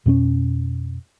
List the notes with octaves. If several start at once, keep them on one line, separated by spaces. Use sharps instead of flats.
F2 B2 C4 C#4